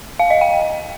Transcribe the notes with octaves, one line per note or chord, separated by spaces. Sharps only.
F5
D#5
G5